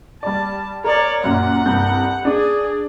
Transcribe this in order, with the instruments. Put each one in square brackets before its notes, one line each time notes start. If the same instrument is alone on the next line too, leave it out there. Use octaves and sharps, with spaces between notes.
[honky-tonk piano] G3 D5 [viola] A5
[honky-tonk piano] A#4 [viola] C#5 D5
[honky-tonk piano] F#2 A#2 [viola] F#5
[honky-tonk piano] C2 G2 G6
[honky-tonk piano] D4 D5 [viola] G#4